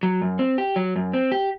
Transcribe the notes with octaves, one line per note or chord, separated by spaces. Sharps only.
F#3
F#2
C4
G4
F#3
F#2
C4
G4